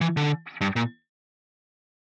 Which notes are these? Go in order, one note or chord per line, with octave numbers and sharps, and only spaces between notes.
E3
D3
G2
A#2